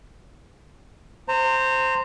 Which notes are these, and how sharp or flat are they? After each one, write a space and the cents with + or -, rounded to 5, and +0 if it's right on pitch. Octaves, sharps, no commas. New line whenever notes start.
C5 +0 A#5 -30